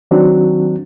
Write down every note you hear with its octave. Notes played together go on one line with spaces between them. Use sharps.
D#3 F#3 C4 D4 F#4